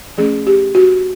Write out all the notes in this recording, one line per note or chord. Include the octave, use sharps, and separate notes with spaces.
F3 A3 C#4 G#4
G4
F#4